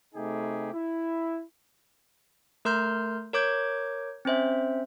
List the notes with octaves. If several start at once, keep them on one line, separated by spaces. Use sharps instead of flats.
C3 A3 D#4 G4 G#4
E4
A3 A#4 C6 F6 G6
A#4 C#5 D6 G6 G#6
C4 C#4 C5 E5